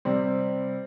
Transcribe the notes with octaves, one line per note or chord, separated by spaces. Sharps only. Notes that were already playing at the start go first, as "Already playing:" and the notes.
C3 G3 C4